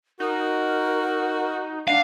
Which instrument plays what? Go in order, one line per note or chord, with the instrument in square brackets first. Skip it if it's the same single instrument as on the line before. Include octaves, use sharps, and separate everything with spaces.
[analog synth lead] D#4 [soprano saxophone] F#4 [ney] A#4
[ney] D4 [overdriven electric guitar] F5 [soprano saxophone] F#5